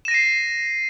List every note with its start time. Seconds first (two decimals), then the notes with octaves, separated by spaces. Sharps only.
0.05 E7
0.08 A#6
0.11 D#7
0.14 C7